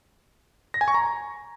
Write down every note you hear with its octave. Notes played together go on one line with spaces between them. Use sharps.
A#6
G#5
C#6
A#5